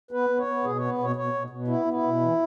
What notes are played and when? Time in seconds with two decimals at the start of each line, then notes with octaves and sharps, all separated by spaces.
0.11 B3 B4
0.29 B3
0.38 C#5
0.47 B3
0.64 B2 G#4
0.77 B3 C#5
0.98 B2 C#5
1.16 B2 C#5
1.33 B2
1.50 B2
1.67 B3 E4
1.85 B3
1.93 E4
2.03 B2
2.21 E3